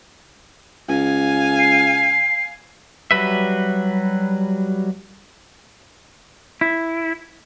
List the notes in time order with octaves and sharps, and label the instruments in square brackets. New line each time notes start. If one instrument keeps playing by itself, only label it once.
[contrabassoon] C#2 [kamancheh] F5 G#5
[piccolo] C7
[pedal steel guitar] F#3 G3 B4 E5
[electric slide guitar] E4